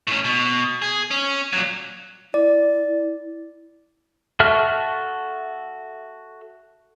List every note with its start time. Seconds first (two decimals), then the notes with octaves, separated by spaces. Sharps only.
0.07 A2 C#4
0.25 B2
0.82 G#4
1.11 C#4
1.53 A#2 F#3
2.34 E4 D5
4.40 F#4 A4 E5 C#6 F6